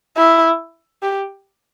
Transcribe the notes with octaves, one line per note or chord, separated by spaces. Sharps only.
E4
G4